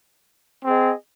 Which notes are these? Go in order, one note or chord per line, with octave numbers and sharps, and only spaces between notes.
C4 G#4 D#5